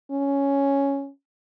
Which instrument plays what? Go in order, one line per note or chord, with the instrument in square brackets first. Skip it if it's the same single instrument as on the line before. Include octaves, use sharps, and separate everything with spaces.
[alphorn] C#4